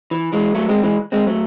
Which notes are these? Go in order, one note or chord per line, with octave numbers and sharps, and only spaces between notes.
E3
E3 G#3
F#3 A3
G#3 C4
E3 G#3
G#3 C4
F#3 A3